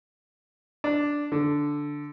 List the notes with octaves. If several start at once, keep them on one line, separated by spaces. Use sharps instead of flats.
D4
D3